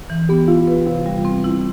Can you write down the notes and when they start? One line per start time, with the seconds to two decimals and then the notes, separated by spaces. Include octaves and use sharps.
0.10 E3
0.29 B3 G4
0.48 E4 F4
0.67 B4
0.86 C3 F4
1.06 G3
1.25 C4
1.44 E4